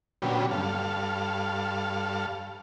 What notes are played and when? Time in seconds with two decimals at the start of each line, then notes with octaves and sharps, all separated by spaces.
0.22 A#2 D3 F#3 B3 C#4 G4
0.51 G2 A4 F5